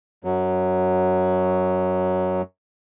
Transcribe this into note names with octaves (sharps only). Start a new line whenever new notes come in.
F#2 F#3